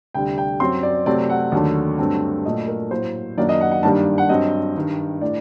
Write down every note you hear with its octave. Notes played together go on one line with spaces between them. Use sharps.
D2 C3 G3 D4 G5
G5
F#2 F#3 C4 C6
D5
C3 F#3 A3 C4 D5
F#5
D#2 D3 F#3 A3
G2 D3 F#3 A3 C4
A#2 F#3 A3 D4 D#5
A#4
A2 F#3 A#3 C5
F#2 D#3 F#3 A#3 D4 D5
D#5
F#5
F#5
G2 D#3 G3 A#3 D4 A5
F#5
G2 F#3 C4 D#5
G2 D#3 G3
A2 A3 D4 D5